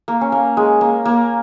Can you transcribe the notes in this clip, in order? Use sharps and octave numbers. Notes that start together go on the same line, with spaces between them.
A#3
C#4
A#3
G#3
A#3
A#3